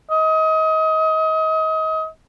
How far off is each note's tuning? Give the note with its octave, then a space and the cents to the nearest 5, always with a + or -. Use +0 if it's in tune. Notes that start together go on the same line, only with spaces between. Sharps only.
D#5 +30